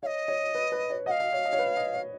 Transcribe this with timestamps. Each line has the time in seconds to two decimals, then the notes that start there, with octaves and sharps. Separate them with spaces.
0.03 C#5 D#5 F5
0.28 C#5
0.55 B4
0.72 B4
0.90 C#5
1.06 D#5 F#5
1.11 F5
1.20 D#5
1.33 C#5
1.45 D#5
1.53 C#5
1.59 B4
1.77 D#5
1.94 C#5